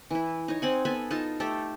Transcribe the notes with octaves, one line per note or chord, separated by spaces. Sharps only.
E3 E4
D#4 C#5
C4 F#5 G#5
B3 A4 G#5 B5
D#4 F4 A4 A5
A3 G4 A4